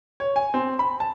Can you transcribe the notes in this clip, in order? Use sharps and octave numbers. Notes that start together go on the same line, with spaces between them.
C#5
G#5
C4
B5
A5